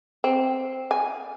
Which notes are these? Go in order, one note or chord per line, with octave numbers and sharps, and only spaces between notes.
C4
G#5